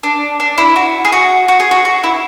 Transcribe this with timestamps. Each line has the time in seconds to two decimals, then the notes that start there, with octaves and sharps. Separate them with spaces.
0.03 D4
0.40 D4
0.58 E4
0.76 F#4
1.05 G#4
1.12 F#4
1.48 F#4
1.60 G#4
1.71 F#4
1.85 F#4
2.04 E4